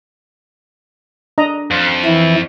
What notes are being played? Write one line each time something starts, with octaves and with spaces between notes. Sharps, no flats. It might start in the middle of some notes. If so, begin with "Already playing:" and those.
D4 D#5 A#5
F2
E3 E4